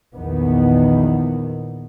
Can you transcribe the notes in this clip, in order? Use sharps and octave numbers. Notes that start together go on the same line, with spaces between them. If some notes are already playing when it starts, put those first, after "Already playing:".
A#1 E2 D#3 B3